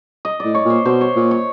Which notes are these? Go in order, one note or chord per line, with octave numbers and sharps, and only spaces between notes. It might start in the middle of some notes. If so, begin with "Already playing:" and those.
D#5
A2 D5
C#5
A#2
C5
B2 C5
C#5
A#2
C#5